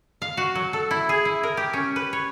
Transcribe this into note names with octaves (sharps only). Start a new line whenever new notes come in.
F5
F#4
F#3
A4
E4
G#4
E4
A#4
G4
C#4
B4
C#5